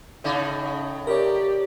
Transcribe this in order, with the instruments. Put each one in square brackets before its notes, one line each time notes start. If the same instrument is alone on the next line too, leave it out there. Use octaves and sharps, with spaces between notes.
[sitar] A2 C#3 D#4
[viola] G4 D5 [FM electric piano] A#4 C#5